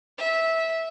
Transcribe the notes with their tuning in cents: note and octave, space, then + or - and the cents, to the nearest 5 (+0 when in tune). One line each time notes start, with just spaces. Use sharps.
E5 -15